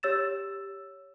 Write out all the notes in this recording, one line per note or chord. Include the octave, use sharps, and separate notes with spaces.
G4 C#5 E6 A6 E7